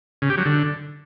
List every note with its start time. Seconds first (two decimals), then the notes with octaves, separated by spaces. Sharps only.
0.22 C#3
0.30 G4
0.38 F#3
0.45 D3